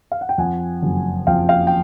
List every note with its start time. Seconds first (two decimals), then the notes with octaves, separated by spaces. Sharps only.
0.12 F5
0.21 F#5
0.29 G5
0.38 F2 F#5 G#5
0.82 F#1
1.27 F2 F5 G5
1.49 F5 G5
1.67 G5